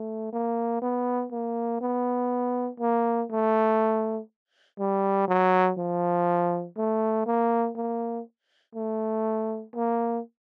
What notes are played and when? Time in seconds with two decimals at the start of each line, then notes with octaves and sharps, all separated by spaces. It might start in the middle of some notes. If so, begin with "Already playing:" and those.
Already playing: A3
0.33 A#3
0.82 B3
1.32 A#3
1.81 B3
2.80 A#3
3.31 A3
4.79 G3
5.28 F#3
5.78 F3
6.77 A3
7.26 A#3
7.76 A#3
8.75 A3
9.75 A#3